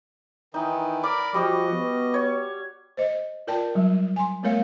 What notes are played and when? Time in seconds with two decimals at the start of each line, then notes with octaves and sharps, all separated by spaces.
0.54 D#3 E3 D#4
1.03 A#4 D5 B5 D6
1.34 F3 G3 F#4 D#5
1.73 B3
2.14 C#5
2.97 C5 D#5
3.47 F4 A#4 D5 G5 A5
3.75 F#3 G3
4.16 G#5 C6
4.43 G3 A3 B3 A#4 C#5 F5